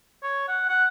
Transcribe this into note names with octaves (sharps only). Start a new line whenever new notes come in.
C#5
F#5
F#5